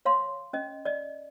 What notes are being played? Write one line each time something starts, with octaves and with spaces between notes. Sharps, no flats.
C#5 F5 C6
C#4 D#5
D5 D#5